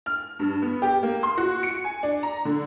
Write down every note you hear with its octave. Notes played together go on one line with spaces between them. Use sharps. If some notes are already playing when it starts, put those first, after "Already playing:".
F6
G2
B3
G4
A#3
C6
F#4
C#7
G#5
D4
A#5
D3